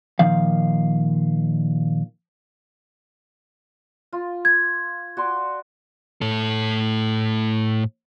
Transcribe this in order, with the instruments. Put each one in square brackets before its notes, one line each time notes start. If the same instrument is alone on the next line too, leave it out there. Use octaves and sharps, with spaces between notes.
[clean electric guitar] A#2 D#3 F3 F5
[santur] F4
[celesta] G#6
[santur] F#4 D5 C6
[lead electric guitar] A2 A4